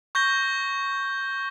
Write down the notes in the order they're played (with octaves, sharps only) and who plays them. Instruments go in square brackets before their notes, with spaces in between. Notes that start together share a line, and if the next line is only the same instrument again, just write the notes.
[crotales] C#6 G6 A#6 G7